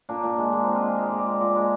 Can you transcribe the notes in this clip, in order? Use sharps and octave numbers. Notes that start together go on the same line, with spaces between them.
A#2 D4
A#2
G#3
G#3 A#3
A#2 C4
F4
G#3 G#4
G#3
A#2 D5
D5
G#3
A#2 D5
G#3